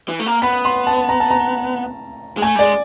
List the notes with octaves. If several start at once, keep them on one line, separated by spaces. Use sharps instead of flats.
E3
A3
A#3
B3 B5
C6
A5
A#5
A5
A#5
G#3
A3 G#5
G3
G#3 D5